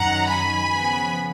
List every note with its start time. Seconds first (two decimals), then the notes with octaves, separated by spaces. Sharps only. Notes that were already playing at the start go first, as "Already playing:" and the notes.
Already playing: F#2 D#3 F#3 F#5 A#5
0.28 G#5 B5
0.70 C#3 F3 B3